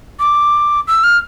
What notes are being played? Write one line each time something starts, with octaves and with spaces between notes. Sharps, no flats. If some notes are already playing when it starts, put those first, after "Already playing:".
D6
E6
F6